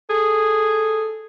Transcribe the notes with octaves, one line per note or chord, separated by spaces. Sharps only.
G#4 A4